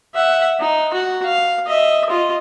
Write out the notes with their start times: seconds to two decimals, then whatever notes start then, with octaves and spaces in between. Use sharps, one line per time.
0.15 E5 F#5
0.60 D#4
0.93 F#4
1.25 F5
1.67 D#5 E5
2.09 F4 D#5